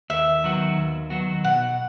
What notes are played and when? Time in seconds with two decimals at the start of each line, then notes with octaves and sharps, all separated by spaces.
0.10 D#2 E5
0.44 D#3 F#3 B3 F#4
0.77 D#2
1.10 D#3 F#3 B3 F#4
1.44 B2 F#5